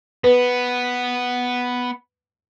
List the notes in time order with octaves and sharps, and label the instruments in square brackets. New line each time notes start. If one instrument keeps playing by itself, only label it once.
[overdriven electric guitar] B3 [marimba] B4